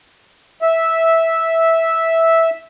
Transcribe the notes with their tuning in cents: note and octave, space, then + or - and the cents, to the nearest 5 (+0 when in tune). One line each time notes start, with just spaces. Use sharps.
E5 -10